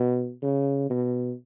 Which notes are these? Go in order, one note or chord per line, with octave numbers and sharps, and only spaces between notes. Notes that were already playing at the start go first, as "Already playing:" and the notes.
Already playing: B2
C#3
B2